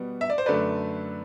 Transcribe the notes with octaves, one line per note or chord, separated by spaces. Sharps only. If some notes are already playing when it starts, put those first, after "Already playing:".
Already playing: B2 G3 B3
E5
D5
C5
F#2 D3 A3 B4 D5